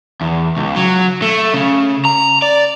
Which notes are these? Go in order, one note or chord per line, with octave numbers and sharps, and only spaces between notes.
E2
C#2
F#3
A3
C#3
A#5
D5